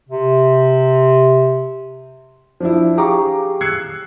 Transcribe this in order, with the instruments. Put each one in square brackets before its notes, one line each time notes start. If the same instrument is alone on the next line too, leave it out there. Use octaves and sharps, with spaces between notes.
[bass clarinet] C3
[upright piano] F3 D4 E4
G4 G#4 F5 A#5 C#6 D6
E6 F#6 G#6 C7 C#7